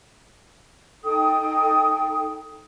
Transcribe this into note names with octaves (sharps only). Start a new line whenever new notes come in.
D#4 A4 G5 D#6